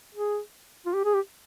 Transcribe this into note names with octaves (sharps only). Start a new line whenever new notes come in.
G#4
F4
G4
G#4
G4